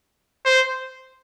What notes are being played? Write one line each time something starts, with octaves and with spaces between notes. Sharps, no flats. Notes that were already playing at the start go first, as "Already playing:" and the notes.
C5